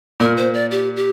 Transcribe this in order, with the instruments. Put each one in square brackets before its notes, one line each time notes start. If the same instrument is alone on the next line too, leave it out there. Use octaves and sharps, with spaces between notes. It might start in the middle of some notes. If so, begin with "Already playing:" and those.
[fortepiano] A#2 [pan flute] A#4
[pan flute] C5
D5
G4
G4